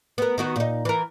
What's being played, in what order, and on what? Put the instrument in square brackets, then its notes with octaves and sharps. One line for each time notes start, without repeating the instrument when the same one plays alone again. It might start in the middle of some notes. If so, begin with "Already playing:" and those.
[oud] B3 A#4
D#3 B3 F#4
A#2 D#4
E3 A#4